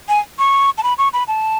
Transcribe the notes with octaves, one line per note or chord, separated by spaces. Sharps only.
G#5
C#6
A5
B5
C#6
B5
A5